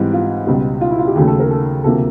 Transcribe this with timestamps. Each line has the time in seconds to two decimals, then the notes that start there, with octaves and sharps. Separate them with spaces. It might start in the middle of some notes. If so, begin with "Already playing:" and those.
Already playing: G#2 E3 G3 C4
0.13 F4
0.47 C#2 B2 G3
0.81 F4
0.91 E4
0.99 F4
1.07 G4
1.15 D#2 C#3 F#3 A3 G#4
1.27 A4
1.39 A#4
1.51 A4
1.84 D2 C3 F3 A#3 A4